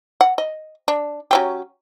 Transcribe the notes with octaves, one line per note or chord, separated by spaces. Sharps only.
F#5
D#5
D4
F#3 C#4 G4